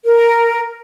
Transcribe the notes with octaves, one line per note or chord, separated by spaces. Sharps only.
A#4